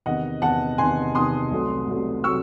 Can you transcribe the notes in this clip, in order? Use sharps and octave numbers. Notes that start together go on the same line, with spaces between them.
E2 C3 D#3 D#5 F#5
E2 C3 D#3 F#5 A5
E2 C3 D#3 G#5 C6
E2 C3 D#3 C6 D#6
C2 C3 F#3 A3
C2 C3 F#3 A3
C3 F#3 A3 C#6 E6